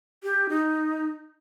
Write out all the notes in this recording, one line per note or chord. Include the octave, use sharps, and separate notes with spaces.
G4
D#4